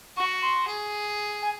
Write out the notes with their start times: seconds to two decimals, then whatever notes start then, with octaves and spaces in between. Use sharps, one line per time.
0.17 F#4 C#6
0.42 C6
0.67 G#4
1.42 G#5